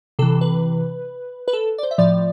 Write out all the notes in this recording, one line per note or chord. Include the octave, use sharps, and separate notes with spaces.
C3 E3 A4
B4
B4
A4
D5
C5
E5
A2 F3 D5